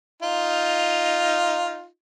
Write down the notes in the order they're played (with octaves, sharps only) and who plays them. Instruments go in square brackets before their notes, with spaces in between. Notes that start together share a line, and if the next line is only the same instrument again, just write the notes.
[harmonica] D#4 F4